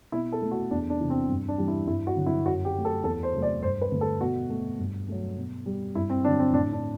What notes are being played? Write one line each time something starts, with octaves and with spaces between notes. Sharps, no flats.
B2 E4
A4
A3
F#4
E2 D4
D4
C3 E3
C4
G2
D4
E3 G3
E4
G2 E4
F#4
D3 F#3
E4
F#2 F#4
G4
F#3 A3
A4
E2 A4
C5
C3 F#3 A3
D5
G2 C5
B4
D3 A3
A4
B2 F#4
A3
G2
F#3 A3
B2
G3
G2 E4
C4
D3 F#3 D4
C4
A2 D4
D4